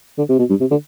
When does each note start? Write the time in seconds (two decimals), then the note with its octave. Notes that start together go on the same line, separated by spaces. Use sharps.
0.18 D3
0.29 C3
0.39 B2
0.50 G2
0.60 C3
0.71 D3